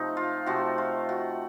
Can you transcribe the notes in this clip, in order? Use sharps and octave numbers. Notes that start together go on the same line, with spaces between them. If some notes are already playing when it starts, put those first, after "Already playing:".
Already playing: C3 F3 A3 D#4
F4
C3 F3 A3 F#4
F4
F#4